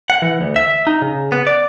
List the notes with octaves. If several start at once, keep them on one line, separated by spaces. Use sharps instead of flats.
F#5
E3
D2
E5
D#4
C#3
B3
D5